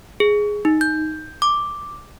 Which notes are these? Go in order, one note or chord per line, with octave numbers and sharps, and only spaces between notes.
G#4
D#4
G6
D6